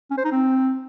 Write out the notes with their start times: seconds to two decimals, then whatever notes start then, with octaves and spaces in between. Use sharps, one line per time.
0.11 C#4
0.18 C5
0.25 D#4
0.32 C4